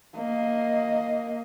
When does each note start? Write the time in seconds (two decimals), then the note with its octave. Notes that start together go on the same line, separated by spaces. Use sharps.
0.16 A#3 D#5